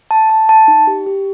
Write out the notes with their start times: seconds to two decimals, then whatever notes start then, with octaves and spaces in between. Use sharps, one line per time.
0.11 A5
0.30 A5
0.49 A5
0.68 D#4
0.87 G4
1.07 G4